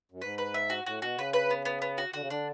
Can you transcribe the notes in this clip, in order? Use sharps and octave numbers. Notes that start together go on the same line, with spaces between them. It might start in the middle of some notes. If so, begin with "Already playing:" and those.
F#2
G#2 B4
B4
E5
F#4
A2 F#4
B2 F#4
C#3 B4
B4
B3
B3
B3
F#4
D3 F#4
C#3
D3 D4